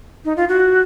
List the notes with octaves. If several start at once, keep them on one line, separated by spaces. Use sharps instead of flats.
D#4
F4
F#4